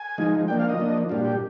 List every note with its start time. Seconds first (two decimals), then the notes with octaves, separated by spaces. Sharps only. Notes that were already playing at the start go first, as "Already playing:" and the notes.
Already playing: G#5
0.18 F3 G#3 D#4
0.48 F3 A#3 D4 G5
0.59 F5
0.69 D#5
0.79 F3 A#3 D4
1.09 A#2 G3 D4 F4
1.25 G4